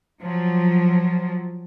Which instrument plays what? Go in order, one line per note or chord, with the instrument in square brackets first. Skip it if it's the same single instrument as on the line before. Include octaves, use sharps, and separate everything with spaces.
[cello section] F3 F#3